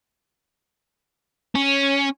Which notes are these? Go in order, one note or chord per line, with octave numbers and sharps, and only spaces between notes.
C#4